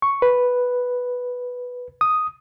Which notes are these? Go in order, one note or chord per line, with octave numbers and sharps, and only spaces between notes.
C#6
B4
D#6